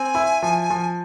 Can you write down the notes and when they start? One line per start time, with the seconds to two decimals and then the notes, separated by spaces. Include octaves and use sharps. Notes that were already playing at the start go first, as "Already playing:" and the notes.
Already playing: C4 G#5
0.15 E4
0.42 F3
0.70 F3